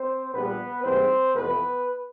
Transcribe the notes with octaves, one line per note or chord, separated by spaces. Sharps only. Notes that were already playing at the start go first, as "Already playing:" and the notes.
Already playing: C4 C5
A#1 A#2 G3 B3 B4
G#2 E3 G3 A#3 C4 C5
F2 C3 E3 A3 B3 B4